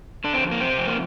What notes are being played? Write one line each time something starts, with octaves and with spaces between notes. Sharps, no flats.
D3 D4
C4
F2
A#3
C3 C4
F2
A#3